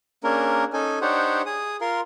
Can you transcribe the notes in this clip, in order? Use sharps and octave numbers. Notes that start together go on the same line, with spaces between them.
A#3 C#4 D4 G#4 A#4
C#4 D#4 A4 G#5
D4 D#4 G4 C5 C#5 F#5
G#4 D#6
F4 A#4 C6